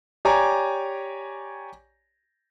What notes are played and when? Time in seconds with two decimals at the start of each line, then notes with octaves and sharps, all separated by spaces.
0.25 G4 C#5 D5 G#5 A#5